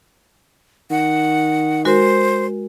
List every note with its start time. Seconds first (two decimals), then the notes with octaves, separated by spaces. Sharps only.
0.90 D#3 F#5
1.85 G#3 F#4 A#4 C5